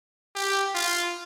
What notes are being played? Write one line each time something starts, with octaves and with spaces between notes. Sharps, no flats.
G4
F4